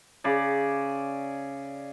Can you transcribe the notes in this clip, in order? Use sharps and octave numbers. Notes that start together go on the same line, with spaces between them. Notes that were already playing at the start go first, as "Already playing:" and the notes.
C#3 D5